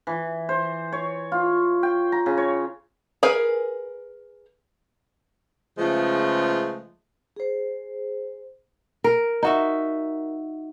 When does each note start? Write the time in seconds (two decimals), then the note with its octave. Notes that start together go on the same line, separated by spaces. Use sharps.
0.07 E3
0.49 C5
0.92 C#5
1.32 F4
1.83 G5
2.12 A#5
2.26 C#3
2.37 C#5
3.23 G#4 A#4 B4 F5 G#5
5.78 C#3 F3 G#3 A3 B3 F4
7.36 G#4 C5
9.04 A#4
9.43 D#4 F#4 E5